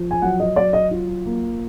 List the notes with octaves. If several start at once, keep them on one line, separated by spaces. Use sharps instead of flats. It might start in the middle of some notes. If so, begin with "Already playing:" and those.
Already playing: F3
G#5
F#3 F#5
D#5
F#3 D5
D#5
F4
A#3